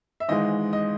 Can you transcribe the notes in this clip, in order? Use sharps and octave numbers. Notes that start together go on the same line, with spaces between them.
E5
G#1 G#2 E3 G#3 D#5
D#5